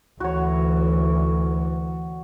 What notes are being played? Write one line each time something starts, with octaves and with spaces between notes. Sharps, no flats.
D2 E3 F#4 C#5